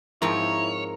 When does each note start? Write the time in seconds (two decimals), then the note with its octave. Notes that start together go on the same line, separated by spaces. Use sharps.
0.22 G#2 F3 C4 E4 A#4 C#5